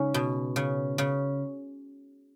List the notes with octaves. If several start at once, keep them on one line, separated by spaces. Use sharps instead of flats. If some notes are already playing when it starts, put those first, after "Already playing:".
Already playing: C#3 G#3 C#4 D#4
B2
C#3
C#3